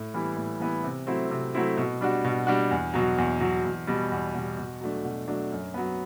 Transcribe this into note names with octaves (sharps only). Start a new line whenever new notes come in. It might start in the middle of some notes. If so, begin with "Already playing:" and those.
Already playing: A2
E3 G3 B3 E4
A2
E3 G3 B3 E4
C3
F#3 A3 C4 E4
C3
F#3 A3 C4 E4
B2
G3 D4 F#4
B2
G3 D4 F#4
E2
B2 F#3
E2
B2 F#3
E2
B2 G3
E2
B2 G3
B2
F#3 A3 D4
B2
F#3 A3 D4
F#2
F#3 B3